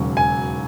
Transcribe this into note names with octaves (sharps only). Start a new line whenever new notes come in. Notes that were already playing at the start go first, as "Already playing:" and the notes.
Already playing: E1 D#2 C#3 F#3
G#5